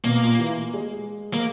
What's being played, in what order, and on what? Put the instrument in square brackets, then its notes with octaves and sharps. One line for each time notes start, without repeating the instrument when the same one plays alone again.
[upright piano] B2 [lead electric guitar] A#3
[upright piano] A#2
E3
G#3
[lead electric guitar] A#3